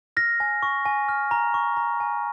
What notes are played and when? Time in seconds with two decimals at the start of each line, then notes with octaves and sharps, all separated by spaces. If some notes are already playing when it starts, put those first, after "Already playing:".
0.17 F6 A#6
0.40 G#5
0.63 C#6
0.85 G#5
1.09 F6
1.31 A#5
1.54 C#6
1.77 A#5
2.00 G#5